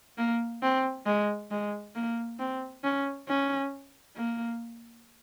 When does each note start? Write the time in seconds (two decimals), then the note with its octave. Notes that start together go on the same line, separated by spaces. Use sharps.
0.18 A#3
0.62 C4
1.06 G#3
1.51 G#3
1.95 A#3
2.39 C4
2.84 C#4
3.28 C#4
4.16 A#3